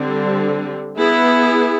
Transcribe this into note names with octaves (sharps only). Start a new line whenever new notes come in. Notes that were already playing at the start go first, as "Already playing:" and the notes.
Already playing: D3 G3 C4
B3 E4 G#4